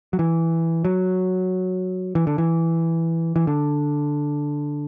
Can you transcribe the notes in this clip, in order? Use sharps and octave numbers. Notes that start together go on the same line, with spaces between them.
F#3
E3
F#3
E3
D3
E3
E3
D3